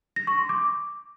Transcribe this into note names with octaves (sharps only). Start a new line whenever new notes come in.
A#6
C#6
C6
D6